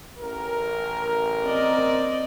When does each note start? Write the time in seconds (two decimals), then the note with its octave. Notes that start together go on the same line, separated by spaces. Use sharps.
0.19 A1 A#4
1.44 C4 D5 D#5